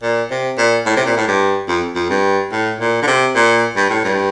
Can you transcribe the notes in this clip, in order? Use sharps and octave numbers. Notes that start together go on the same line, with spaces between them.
A#2
C3
A#2
A2
C3
A#2
A2
G2
F2
F2
G2
A2
A#2
D3
C3
A#2
G2
A2
G2